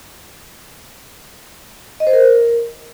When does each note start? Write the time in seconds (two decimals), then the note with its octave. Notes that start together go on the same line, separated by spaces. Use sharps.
2.00 D#5
2.07 C5
2.13 A#4